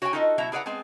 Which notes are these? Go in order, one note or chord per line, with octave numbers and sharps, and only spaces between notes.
F#4 C#5 D#5 F5 G5 G#5
D#4 F4 F#4 A4 C#5 D#5
B2 F#3 E4 E5 A#5
E4 G#4 B4 D5 F#5 A#5
G#3 B3 C4 G#4